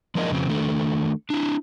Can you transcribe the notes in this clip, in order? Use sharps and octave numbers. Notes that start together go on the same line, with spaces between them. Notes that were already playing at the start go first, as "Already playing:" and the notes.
F3 G#3 A#3 D4 A#4 D#5
F2 C#3 C4
D#3 A3 D4 A4
D4 E4